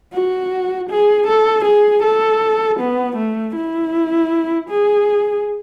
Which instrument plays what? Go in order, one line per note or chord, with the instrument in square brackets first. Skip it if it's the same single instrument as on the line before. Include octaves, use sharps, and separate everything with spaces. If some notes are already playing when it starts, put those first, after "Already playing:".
[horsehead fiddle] F#4
G#4
A4
G#4
A4
B3
A3
E4
G#4